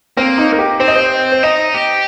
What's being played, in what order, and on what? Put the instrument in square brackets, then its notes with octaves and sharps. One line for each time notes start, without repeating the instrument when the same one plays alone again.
[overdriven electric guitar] A#3 [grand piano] C4
[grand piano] D#4
A#4
G4
[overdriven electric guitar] C4 [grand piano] C5
[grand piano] D#5
C5
C5
[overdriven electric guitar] D#4 [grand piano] D#5
[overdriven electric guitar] G4